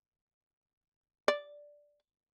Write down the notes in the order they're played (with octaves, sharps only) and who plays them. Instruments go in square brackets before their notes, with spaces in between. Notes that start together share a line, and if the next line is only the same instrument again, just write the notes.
[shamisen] D5